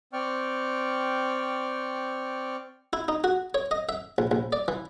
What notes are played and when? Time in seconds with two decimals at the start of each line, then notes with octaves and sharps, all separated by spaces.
0.13 C4 D5 G5 C#6 F6
2.93 E4
3.08 D#4
3.24 F#4
3.54 C#5
3.71 D#5
3.89 E5
4.18 A#1
4.31 A#1
4.53 D5
4.68 E3